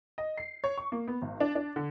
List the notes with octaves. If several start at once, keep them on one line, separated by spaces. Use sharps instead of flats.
D#5
C7
C#5
C#6
A#3
B3
G#1
D4
D4
D3